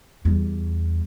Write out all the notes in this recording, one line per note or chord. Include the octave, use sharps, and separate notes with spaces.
E2 G3